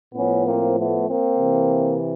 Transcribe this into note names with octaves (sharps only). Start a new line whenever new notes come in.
A2 F3 B3 C#4
A#3 C4
A3 B3
A#3 C4
C3 E3